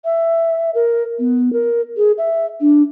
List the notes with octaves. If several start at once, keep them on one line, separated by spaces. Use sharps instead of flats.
E5
A#4
B3
A#4
G#4
E5
D4